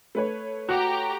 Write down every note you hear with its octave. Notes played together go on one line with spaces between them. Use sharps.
A3 B4 C#5
F#4 G4 A#5